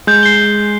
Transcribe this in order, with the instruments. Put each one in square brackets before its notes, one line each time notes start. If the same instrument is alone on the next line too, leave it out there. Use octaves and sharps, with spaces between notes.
[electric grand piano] G#3 [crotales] G6
[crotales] C7 G7